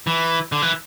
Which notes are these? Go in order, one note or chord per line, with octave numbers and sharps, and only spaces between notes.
E3
D3
E3